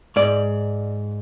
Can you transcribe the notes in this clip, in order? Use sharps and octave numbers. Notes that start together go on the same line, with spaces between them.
G#2 D5